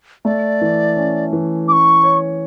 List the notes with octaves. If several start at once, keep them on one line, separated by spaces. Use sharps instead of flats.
A3 D5
E3
C#4
E3
C#4 C#6 D6
C#5